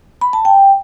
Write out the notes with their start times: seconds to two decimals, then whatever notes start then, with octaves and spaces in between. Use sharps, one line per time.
0.21 B5
0.33 A5
0.45 G5